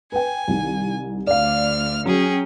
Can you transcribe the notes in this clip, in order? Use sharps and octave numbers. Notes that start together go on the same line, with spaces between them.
B4 G5 G#5
C2 D#3
D2 D5 F5 F6
F#3 C#4 G#4 G5